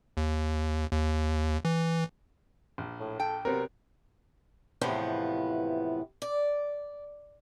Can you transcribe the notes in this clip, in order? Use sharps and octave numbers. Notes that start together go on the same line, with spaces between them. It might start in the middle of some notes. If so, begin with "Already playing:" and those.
D#2
D#2
E3
A#1
A2
A4 G5
C3 F#3 B3 C4 A#4
E2 A2 C3 E3 F3 B3
D5